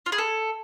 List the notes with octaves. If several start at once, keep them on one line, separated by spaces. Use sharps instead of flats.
F4
G#4
A4